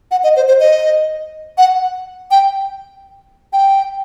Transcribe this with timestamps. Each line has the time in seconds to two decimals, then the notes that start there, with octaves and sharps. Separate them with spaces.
0.11 F#5
0.24 D#5
0.36 C5
0.48 C5
0.60 D#5
1.58 F#5
2.31 G5
3.53 G5